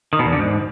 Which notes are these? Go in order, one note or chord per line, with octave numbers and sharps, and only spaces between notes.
D#3
B2
E2
D3
G#2